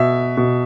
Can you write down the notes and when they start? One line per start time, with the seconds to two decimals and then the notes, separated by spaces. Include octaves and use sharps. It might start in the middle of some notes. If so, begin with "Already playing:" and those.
Already playing: B2 E5
0.37 B2